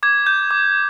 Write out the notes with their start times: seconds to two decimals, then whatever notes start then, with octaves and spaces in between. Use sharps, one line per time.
0.03 D6 G#6
0.27 G6
0.51 D6